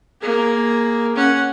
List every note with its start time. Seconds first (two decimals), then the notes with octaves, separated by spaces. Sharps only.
0.21 A#3 G#4
1.16 C#4 F#5